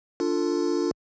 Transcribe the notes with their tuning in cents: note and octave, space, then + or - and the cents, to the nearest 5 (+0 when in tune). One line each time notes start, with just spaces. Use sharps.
D4 +0 F4 +0 A4 +25